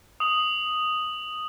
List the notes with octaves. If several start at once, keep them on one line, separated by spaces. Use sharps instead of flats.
D#6 F#7